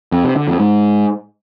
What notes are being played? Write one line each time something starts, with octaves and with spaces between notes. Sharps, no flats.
F2
C3
D3
F2
G#2